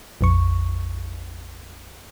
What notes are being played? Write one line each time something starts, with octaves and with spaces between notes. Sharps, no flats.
A#1 F2 C#6